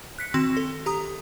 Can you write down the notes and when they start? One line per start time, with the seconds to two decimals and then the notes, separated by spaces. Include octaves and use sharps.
0.18 F#6 B6 C#7
0.34 D#3 C4 F#4 C6 E7
0.57 A4
0.86 G4 A#5 D#6